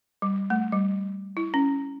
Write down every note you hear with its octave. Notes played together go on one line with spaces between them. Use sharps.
G3
A3
G3
E4
C#4